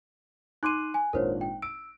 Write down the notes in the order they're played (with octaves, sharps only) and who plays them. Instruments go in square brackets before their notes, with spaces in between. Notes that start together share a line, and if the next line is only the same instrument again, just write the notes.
[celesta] D#4 D#7 [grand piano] C6 D6 F#6
[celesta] G#5
[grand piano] G#1 A#2 D4 [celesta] A#4 C5 C#5
[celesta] G5
[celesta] E6 [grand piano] D7